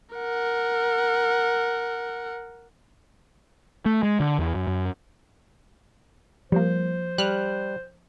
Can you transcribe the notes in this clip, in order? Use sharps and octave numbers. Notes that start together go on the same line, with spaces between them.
A#4 F#5
A3
G#3
D3
E2
F#2
F#2
F3 G3 A#3 C5
G3 F6 F#6